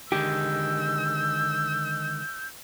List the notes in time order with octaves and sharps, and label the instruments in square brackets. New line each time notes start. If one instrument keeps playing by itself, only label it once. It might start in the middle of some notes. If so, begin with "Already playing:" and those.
[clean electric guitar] D3 D#3 G#3 [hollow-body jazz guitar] G4 [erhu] E6 [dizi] G6